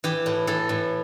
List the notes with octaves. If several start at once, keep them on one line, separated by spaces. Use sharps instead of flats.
E3 G4
A2
E3 A4
A2